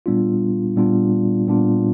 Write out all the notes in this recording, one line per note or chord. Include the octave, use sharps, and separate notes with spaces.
A#2 G3 B3 D4 F4
A#2 G3 B3 D4 F4
A#2 G3 B3 D4 F4